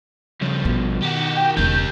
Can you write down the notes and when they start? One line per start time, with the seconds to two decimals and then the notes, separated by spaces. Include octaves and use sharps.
0.42 G2 C#3 F3
0.65 A1 B2
1.02 D#3 F#4 G4
1.36 G5
1.57 E1 C#2 G4 A#4 G6